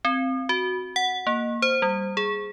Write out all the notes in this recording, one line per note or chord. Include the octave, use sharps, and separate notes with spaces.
C4
F#4
F#5
A#3
C5
G3
G#4